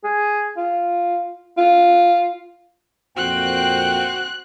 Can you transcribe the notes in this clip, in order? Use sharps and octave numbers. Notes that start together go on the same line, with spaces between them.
G#4
F4
F4
F2 A#2 C4 F#4 G5 F#6